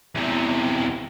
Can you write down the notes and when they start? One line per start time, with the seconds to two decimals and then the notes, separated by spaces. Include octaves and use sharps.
0.15 E2 C3